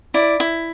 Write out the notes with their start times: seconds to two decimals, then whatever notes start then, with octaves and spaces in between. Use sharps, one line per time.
0.14 E4 D5
0.40 E4